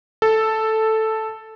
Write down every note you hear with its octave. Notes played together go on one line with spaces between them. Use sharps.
A4